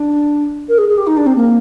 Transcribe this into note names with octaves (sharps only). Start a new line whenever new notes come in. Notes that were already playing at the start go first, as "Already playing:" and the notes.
Already playing: D4
A#4
G#4
G#4
G4
D#4
D4
C4
A#3